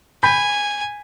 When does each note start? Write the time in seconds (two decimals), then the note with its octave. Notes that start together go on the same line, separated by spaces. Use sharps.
0.23 G#5 B5 G6 B6